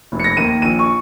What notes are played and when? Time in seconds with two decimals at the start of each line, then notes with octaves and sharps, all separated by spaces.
0.12 F1
0.20 C#7
0.24 A#6
0.37 D#2 D#3 A#3 D#7
0.62 A#1 D#7
0.79 C#6